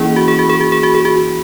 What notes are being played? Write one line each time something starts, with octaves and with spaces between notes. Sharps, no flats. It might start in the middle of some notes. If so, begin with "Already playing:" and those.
Already playing: E3 A#3 C#4 E4 G#4
F#4
G#4
F#4
G#4
F#4
G#4
F#4
G#4
F#4